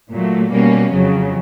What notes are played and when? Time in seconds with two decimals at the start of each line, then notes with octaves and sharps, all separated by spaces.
0.11 A#2 F#3 A3
0.52 B2 G3 A#3 C#4
0.93 F2 C#3 F#3